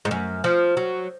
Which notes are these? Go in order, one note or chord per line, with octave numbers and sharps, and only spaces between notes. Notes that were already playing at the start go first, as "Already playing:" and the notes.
G#2
F#2
F3
F#3